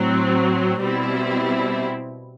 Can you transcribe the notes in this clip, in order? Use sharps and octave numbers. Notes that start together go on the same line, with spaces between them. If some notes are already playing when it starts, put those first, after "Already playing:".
Already playing: A2 F#3 C4
B2 G3 C4 E4